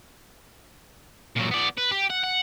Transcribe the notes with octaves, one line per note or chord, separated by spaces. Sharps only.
A#2 F#3
B3 D5
B4
G4
F#5
F#5